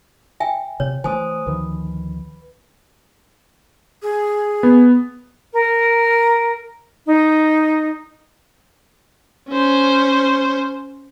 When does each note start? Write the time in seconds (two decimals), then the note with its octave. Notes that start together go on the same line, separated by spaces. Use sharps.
0.40 E5 G5 G#5
0.80 C3 C#5
1.04 E3 G#3 A3 C5 G#5 D#6
1.47 D2 D#3 F3 B4
4.02 G#4
4.63 B3
5.53 A#4
7.06 D#4
9.50 C#4 C5